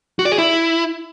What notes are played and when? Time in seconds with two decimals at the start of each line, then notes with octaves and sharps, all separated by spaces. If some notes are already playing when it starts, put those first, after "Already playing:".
0.19 F#4
0.25 D5
0.32 G#4
0.38 E4